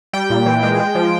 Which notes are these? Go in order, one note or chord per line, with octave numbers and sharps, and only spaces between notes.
G3 G5
A#2
E3
G#3
G#3
F3